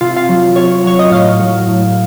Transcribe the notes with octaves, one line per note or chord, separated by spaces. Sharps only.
C3 F4
F4
F#3
C3 C#5
F#3 C#5
D#5
A2 F5
F#3
A2